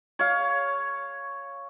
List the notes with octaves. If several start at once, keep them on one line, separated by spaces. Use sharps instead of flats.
C#5 F5